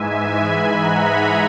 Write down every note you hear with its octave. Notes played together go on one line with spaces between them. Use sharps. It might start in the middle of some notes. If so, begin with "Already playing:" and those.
Already playing: G#2 E3 G#3 E5 G#5
G#5 B5
F#5 A#5